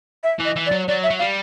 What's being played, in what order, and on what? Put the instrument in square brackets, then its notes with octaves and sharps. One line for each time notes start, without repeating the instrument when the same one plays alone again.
[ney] E5
[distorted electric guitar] E3
[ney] D#5
[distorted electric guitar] E3
[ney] D5
[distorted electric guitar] F#3
[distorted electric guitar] F#3 [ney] D5
[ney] E5
[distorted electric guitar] F#3
[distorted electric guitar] G3 [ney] F5